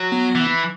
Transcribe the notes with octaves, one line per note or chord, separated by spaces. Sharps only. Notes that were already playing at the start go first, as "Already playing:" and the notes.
Already playing: F#3
B3
E3